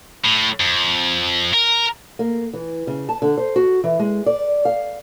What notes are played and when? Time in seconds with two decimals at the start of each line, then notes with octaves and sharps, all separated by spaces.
0.24 A2
0.60 F2
1.54 A#4
2.19 A#3
2.54 E3
2.87 C#3
3.09 A5
3.22 D3
3.38 C5
3.56 F#4
3.84 E3
3.99 G#3
4.26 D5
4.65 F5